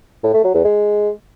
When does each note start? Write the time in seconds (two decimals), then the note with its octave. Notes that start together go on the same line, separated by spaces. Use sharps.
0.24 A2
0.34 A3
0.44 F#3
0.54 E2
0.65 G#3